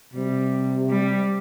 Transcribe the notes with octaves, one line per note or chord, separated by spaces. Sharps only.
C3 G3
G3